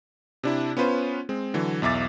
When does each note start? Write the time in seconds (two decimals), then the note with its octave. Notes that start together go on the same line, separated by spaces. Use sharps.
0.43 C3 D4 E4
0.77 B3 C#4 F4 B4 C5
1.29 G#3 C4
1.54 D3 E3 F#3
1.82 B1 E2 E5 D6 A6